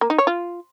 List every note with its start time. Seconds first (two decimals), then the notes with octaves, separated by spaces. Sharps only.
0.01 A#3
0.10 D#4
0.18 C#5
0.27 F4